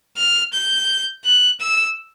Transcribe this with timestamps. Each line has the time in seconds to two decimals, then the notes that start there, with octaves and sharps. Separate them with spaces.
0.17 F6
0.53 G6
1.25 F#6
1.61 E6